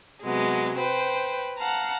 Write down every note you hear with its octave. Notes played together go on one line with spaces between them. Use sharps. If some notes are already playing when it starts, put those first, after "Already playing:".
C3 F#3 G#3 B3
B4 C5 G5
F5 F#5 A5 A#5